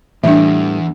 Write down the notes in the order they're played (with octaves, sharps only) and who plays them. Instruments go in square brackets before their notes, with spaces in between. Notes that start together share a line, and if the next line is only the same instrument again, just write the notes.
[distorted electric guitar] E2 [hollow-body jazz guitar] A2 E3 G3 [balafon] D4 E5